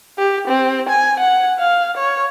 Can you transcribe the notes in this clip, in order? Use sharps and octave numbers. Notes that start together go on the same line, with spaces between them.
G4
C4
G#5
F#5
F5
C#5